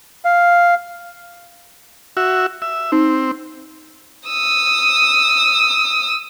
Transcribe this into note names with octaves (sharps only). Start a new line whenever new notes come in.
F5
F#4 E5
E5
C4 D#4
D#6 E6